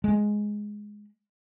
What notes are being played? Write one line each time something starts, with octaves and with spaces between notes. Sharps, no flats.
G#3